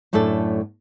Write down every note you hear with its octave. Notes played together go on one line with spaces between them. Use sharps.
F#2 A2 A3 D4 A4